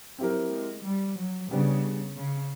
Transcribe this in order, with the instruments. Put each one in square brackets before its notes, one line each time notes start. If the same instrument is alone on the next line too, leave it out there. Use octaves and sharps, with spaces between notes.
[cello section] F#3 [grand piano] C4 E4 G4 A#4
[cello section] G#3
G3
F#3
[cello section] C#3 [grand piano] G3 B3 D4
[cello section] C#3